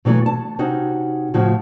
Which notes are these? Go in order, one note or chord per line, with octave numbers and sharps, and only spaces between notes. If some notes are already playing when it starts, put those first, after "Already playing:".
B2 E3 F#3 A3
A5
C3 C#4 D#4 F#4
A2 C#3 F3 F#4